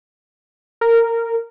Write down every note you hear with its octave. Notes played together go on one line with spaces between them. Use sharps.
A#4